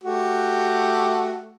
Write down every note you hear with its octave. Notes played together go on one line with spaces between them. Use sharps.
A3 F#4 G4